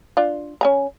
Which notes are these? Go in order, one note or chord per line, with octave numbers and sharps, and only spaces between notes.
D4 F4
C#4 G#5 A#5